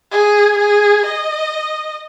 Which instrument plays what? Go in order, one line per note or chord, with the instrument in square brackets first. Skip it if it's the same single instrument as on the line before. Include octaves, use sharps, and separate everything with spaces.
[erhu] G#4
G#4
D#5